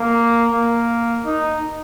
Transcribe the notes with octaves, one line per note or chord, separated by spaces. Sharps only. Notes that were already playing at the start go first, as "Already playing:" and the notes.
Already playing: A#3
A#3
D#4